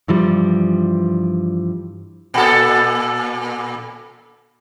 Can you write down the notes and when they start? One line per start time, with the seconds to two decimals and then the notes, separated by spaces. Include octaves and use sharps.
0.08 G2 E3 F3 G3
2.34 A#2 A4